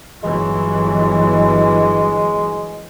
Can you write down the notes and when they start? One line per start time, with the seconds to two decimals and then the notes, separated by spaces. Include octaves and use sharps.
0.23 G1 E3 F#3 G#3